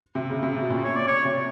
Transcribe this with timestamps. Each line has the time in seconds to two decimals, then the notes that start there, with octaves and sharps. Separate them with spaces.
0.15 C3
0.29 C#3
0.43 C3
0.57 B2
0.70 A#2
0.84 C#5
0.96 D5
1.07 C#5
1.25 C3